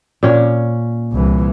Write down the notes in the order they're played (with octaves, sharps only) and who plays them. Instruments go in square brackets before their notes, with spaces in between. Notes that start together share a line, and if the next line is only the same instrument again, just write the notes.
[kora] A#2 C#4
[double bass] C2 E3